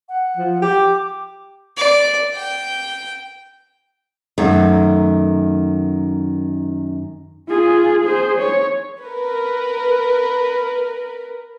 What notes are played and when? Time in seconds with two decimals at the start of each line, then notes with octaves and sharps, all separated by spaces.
0.09 F#5
0.37 F3
0.62 G4 D6
1.78 D5
2.35 G5
4.38 F#2 D#3 A3
7.49 F4 G#4
8.05 G#4 C5
8.39 C#5
9.01 A#4 B4